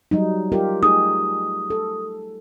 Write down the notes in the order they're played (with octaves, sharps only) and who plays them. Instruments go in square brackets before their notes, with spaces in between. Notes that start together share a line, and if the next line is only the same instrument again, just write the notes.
[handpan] F#3 G3 D#4
F4 G4 A#4
[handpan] A3 D#4 G#4 [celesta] D#6
[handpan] A4